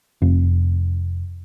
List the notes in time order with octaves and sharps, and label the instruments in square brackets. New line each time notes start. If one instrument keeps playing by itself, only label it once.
[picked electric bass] F1